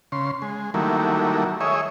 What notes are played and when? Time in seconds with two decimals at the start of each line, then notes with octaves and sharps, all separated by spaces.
0.12 C#3 C6
0.42 G#3
0.74 D#3 F#3 G3 A3 A#3 E4
1.61 G#4 C#5 D#5 E5